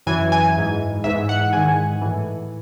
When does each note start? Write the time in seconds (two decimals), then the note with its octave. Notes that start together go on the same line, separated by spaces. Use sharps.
0.07 F#2 E3 G#5
0.32 G#5
0.56 G#2 E3
1.04 G#2 E3 E5
1.29 F#5
1.53 G#2 D#3 G#5
2.02 A2 E3